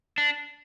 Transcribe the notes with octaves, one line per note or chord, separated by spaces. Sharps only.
D4